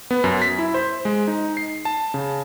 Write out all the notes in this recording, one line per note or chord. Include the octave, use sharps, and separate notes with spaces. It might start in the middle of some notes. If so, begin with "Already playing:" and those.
B3
F#2
B6
E4
C5
G#3
D#4
C7
A5
C#3